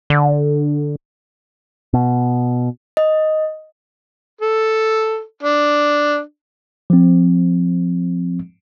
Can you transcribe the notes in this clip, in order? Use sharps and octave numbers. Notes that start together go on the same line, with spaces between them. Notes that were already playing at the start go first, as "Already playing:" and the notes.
D3
B2
D#5
A4
D4
F3 C4